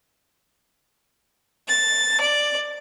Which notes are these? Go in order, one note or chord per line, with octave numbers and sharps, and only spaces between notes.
A6
D5